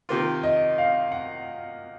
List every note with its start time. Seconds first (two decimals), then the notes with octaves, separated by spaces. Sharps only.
0.09 C3 D#3 A#3 F4
0.43 D#5
0.78 F5
1.12 F#5